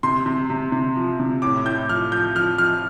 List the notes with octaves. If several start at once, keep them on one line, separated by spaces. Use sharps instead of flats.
C3 C6
C3
C3
C3
F3
C3
A2 D6
A2 G6
F3 F6
F3 G6
F3 F6
F3 F6